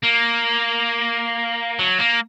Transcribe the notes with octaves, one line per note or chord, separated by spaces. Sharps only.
A#3
F#3
A#3